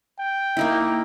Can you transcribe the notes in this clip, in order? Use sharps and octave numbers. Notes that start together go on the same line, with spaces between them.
G5
A#3 D#4 E4